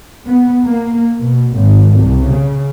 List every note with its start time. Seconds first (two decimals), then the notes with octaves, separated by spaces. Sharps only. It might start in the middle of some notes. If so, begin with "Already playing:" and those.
0.28 B3
0.65 A#3
1.19 B2
1.55 G#1
1.98 C2
2.30 C#3